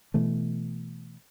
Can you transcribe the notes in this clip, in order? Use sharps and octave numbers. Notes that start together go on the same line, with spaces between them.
B2 E3 A3